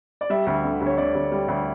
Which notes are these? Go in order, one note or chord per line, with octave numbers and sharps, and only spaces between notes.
D5
G3 E5
D2
D3
D2
C#5
D3 D5
D2
G3
D2